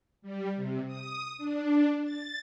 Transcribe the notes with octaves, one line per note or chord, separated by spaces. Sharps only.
G3
C3
D#6
D4
A6